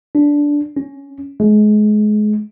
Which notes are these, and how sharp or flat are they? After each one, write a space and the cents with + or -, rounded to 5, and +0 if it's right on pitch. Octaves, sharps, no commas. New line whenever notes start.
D4 -10
C#4 +5
G#3 +30